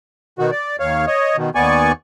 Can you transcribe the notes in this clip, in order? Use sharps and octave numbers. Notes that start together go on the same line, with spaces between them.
B2 D#3 F#4
D5
D#2 C#5 F5
C#5 D#5
B2 D#3
D#2 B3 D5 G#5 C#6